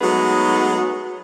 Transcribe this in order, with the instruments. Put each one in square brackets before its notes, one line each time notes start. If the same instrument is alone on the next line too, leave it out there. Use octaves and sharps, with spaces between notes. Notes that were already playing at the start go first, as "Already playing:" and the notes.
[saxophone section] F#3 G#3 A3 B3 D#4 G#4